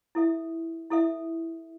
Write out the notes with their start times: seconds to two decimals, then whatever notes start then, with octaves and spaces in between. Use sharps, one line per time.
0.15 E4 A4 E5
0.91 E4 A4 E5